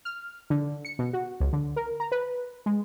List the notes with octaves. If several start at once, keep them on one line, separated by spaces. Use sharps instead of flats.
F6
D3
C#7
B2
F#4
C#2
D3
A#4
A#5
B4
G#3